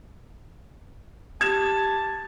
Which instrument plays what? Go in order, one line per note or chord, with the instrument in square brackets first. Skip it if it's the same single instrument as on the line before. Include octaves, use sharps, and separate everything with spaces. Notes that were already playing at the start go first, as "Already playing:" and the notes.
[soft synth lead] G4 [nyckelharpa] A5 [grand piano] G#6 E7